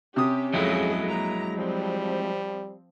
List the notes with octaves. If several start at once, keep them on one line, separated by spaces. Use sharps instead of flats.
C3 C#4 G4 D#6
F2 F#3 G#3 E4 G#4 A4 D#5
A#3 A#5
F3 G3 C4